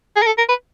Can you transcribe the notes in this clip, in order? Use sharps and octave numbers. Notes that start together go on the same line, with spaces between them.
G#4
A#4
A4
A#4
B4